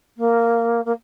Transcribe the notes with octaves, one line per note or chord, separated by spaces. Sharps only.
A#3
A#3